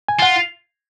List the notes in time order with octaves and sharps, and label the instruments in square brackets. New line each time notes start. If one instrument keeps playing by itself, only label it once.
[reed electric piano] G#5
[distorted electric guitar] F4 [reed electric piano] F#5